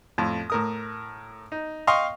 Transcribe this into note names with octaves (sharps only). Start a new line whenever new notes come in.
F2 A2
A2 A#4 D#6
D#4
D#5 F5 G5 C6 C#6 D#6